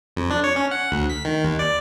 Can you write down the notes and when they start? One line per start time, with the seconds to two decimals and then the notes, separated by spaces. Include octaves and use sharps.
0.17 F2
0.31 D4
0.44 C#5
0.56 C#4
0.71 F#5
0.92 D2
1.10 B6
1.25 D#3
1.44 D#2
1.59 D5